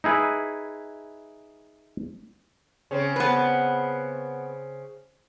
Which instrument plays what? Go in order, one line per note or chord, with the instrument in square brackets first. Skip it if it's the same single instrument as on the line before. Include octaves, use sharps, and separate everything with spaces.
[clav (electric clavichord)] D#4 E4 G#4 B4
[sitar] C#3 C4
[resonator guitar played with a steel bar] B3 B4